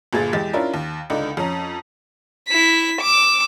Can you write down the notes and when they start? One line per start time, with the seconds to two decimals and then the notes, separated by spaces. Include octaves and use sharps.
0.13 G1 A#2 G#4 A6
0.33 E2 G#3 G4 A6
0.53 C#4 D4 E4 F4 A#4
0.74 D#2
1.10 C#2 D3 D#4 D5
1.37 F2 C#4 A#5
2.49 E4 B6
3.01 D6 E6